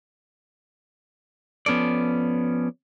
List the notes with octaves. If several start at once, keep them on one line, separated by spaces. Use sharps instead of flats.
F3 B3 C#4 A4 D5